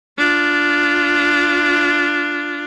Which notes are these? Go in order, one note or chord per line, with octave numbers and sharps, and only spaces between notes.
D4 F4